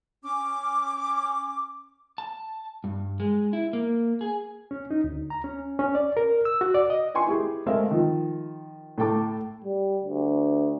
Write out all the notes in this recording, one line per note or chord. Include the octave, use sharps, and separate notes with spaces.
C#4 D6
A5
G2
G#3
E4
A#3
G#4
C#4
D#4
D2
A#5
C#4
C#4
D5
A#4
E6
F#4
D5
D#5
B4 G5 G#5 C6 C#6
E4 G4 G#4
G#3 A3 C4 A#4 E5 F5
D#3 F3
A2 A3 A4 G5 A5 D6
G3
D2